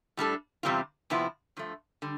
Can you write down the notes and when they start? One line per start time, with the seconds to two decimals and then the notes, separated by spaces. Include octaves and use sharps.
0.17 A2 G3 D4 A4
0.63 E2 C3 G3 C4 F4
1.10 F2 C3 F3 B3 E4
1.57 G2 F3 A3
2.02 D3 G3